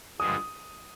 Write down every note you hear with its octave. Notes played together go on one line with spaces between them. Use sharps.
G2 D3 F3 G#3 D#6